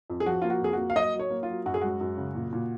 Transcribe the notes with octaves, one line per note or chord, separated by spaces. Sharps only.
F2
G#4
F3 F#4
A#3 F4
F#4
F2 G#4
F#4
A#3
F5
F#3 D#5
F#3
C#5
A#3
F4
F#3
F#2 F#4
G#4
G#3 F#4
F#2
C#3
A#2
A#2